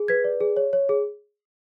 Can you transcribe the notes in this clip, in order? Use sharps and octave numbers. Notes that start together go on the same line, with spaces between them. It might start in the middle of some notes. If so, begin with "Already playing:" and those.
Already playing: G#4
B4 G#6 B6
D5
G#4
C#5
C#5
G#4